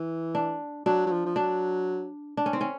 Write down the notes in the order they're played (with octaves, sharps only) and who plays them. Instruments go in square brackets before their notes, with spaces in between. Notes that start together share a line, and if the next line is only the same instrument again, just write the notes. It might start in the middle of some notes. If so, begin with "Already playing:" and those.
Already playing: [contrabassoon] E3
[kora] D4
[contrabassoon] F#3 [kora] D4
[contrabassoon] F#3
F3
F3
[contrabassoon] F#3 [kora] D4
[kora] D4
C#4
[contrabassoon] D#3 [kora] C4
[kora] C#4